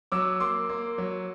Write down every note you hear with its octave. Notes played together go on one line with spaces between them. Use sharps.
F#3 D6 E6
A#3 C6 D6
A#3
F#3